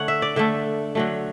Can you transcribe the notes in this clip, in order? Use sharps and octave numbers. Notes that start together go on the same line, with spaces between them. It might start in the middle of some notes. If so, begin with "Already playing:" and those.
Already playing: D3 A3 C#5 F#5
E5
D5
D3 A3 E5
D3 F#3 A3